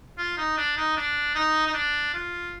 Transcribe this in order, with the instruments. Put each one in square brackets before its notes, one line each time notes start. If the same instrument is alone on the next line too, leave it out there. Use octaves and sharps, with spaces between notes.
[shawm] F4
D#4
D4
D#4
D4
D#4
D#4
D4
F4